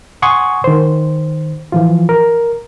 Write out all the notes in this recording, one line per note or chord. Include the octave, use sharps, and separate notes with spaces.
F#5 G#5 C6 C#6 D#6 G#6
D#3 C5
E3 F3 F4
A#4